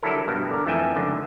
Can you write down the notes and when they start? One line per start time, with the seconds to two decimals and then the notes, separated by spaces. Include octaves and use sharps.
0.03 D3 F#3 G3 E4 A4 A#4
0.28 G2 B2
0.50 D3 A#4
0.66 F2 E3 A3 E5 G5 G#5
0.95 C#2 F#2 D3 D#3